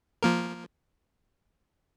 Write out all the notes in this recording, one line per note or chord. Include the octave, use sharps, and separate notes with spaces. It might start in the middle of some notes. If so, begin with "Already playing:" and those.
F3 A#3 A#4